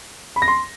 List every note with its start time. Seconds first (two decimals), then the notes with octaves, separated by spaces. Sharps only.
0.36 B5
0.42 A#6
0.48 C6